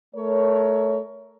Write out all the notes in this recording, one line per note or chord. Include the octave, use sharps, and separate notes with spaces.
A3 A#4 C#5